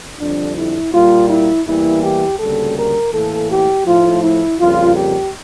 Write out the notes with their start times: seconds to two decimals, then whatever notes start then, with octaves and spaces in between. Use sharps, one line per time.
0.20 F2 D3 G3 D4
0.57 E4
0.93 A#2 G3 A#3 F4
1.30 E4
1.66 E2 E3 G3 A#3 E4
2.03 G4
2.39 D2 C#3 G3 A#3 A4
2.77 A#4
3.12 A2 E3 A#3 A4
3.50 G4
3.86 A2 F3 A3 F4
4.22 E4
4.59 F2 C#3 G3 A#3 F4
4.96 G4